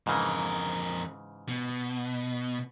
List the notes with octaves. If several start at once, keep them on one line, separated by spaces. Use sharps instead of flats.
F2 G#2 C#3 E3 A#4
B2